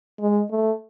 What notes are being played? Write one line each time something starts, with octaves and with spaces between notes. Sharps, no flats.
G#3
A3